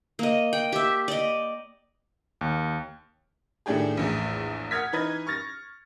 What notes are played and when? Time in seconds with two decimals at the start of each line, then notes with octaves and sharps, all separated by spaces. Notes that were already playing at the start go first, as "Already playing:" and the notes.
0.19 A#3 D#5
0.53 G5
0.72 G4 E5
1.08 D5 D#5
2.41 D#2
3.66 A2 D#3 A3 D4 G4 G#4
3.97 A#1 E2 A2
4.71 F#5 D#6 F6 G#6 B6
4.92 E3 D#4 B4 D#5 G#6
5.27 C#6 F6 A6 A#6